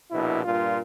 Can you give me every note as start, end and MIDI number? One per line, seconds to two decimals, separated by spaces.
0.11 0.44 34
0.11 0.44 47
0.11 0.44 64
0.45 0.79 43
0.45 0.79 46
0.45 0.79 65